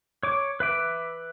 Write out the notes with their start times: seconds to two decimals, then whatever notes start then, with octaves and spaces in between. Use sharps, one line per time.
0.23 C#5 D6
0.60 B4 E5 D6